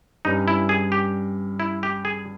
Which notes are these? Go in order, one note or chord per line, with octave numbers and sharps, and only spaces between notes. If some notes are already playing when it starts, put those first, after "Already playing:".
G2 G3 C#4 D#4
E4
G#4
G4
E4
G4
G#4